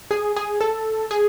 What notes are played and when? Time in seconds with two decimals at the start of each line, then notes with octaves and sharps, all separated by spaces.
0.11 G#4
0.36 G#4
0.61 A4
1.11 G#4